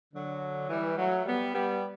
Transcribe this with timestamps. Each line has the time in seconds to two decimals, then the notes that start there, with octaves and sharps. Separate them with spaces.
0.13 D3 F#3
0.70 E3 G3
0.98 F#3 A3
1.26 G3 B3
1.54 G3 B3